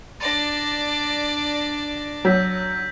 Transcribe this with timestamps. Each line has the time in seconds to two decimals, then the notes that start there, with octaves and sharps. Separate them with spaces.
0.20 D4 D5 A6 A#6
2.25 F#3 E6 G6 B6